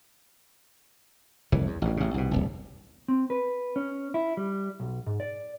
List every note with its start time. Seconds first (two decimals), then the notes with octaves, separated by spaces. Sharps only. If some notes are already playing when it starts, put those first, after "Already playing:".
1.52 F1 C2 E3
1.67 E2
1.82 A1 G2
1.97 A1 C#3
2.14 C2 B2
2.31 D1 G1 C2
3.08 C4
3.30 B4
3.76 C#4
4.14 E4
4.37 G3
4.80 B1
5.07 G#2
5.20 D5